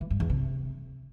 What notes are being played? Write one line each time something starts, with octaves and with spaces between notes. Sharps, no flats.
E3
G2
E2
C3